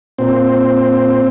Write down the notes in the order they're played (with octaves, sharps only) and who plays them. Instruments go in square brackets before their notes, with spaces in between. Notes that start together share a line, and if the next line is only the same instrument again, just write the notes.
[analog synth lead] A#2 [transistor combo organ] C4